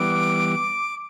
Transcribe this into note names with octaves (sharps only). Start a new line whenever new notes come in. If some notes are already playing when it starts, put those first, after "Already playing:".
Already playing: E3 G3 B3 D6